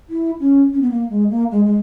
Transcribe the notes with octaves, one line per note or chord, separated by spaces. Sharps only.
E4
C#4
C#4
B3
A#3
G#3
A#3
G#3
G#3